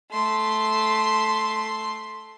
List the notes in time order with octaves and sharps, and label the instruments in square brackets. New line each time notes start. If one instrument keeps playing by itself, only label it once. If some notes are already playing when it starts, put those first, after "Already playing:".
[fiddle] A3 C6